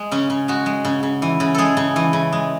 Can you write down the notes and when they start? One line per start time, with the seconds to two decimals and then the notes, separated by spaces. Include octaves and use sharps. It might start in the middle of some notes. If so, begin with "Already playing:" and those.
Already playing: G#3
0.12 C#3 C#4
0.30 C#3
0.48 G#3 F#4
0.66 G#3
0.85 C#3
1.03 C#3
1.22 E3
1.40 C#3
1.54 G#3 G#4 A4
1.77 C#3
1.96 E3
2.13 C#3
2.33 G#3